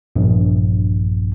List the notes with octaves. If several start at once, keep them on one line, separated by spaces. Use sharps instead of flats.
A#1 E2 G2